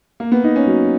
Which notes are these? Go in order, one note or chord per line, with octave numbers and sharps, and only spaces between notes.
A#3
B3
D#4
C#4
F#3